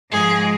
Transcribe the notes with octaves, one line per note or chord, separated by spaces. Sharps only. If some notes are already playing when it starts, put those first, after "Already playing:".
G#2 F3 G#3 G#4